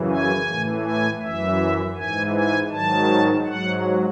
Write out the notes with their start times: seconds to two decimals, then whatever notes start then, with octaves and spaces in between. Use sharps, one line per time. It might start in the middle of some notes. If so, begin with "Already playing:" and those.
Already playing: F#2 C#3 E3
0.10 G#5
0.47 A2 E3
0.84 G#5
1.21 F#2 E3 E5
1.96 G#2 E3 G#5
2.33 G#5
2.71 G#2 D#3 F#3 A5
3.46 G#2 F#3 F#5